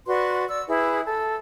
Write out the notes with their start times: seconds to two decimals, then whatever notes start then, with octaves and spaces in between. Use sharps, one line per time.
0.07 F#4 B4 D5 C6
0.48 D5 E6
0.68 E4 G#4 B4
1.04 A4